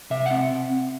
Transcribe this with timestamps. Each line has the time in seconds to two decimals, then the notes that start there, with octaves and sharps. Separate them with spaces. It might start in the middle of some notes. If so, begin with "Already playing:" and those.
0.10 C3 E5
0.26 C4 F#5